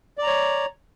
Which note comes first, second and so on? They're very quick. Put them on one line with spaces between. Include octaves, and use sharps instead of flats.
D5 A#5 C#5